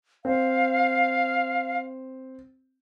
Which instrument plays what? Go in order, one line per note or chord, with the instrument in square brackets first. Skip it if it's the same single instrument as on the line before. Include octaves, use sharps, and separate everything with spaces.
[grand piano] C4 [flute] F5